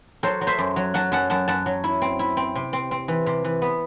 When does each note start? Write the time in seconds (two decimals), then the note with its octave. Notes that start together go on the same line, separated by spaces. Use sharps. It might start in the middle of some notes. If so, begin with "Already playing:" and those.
0.23 F#3 A4 C5
0.41 F#3
0.47 C5 E5
0.58 F#2
0.76 F#3
0.94 F#3 F#5 A5
1.12 F#2 F#5 A5
1.30 F#2 F#5 A5
1.48 F#2 F#5 A5
1.66 F#3
1.84 E4
2.02 C4
2.19 E4
2.37 C4
2.55 C3
2.73 C4
2.91 C4
3.08 E3
3.26 C3
3.44 E3
3.62 B3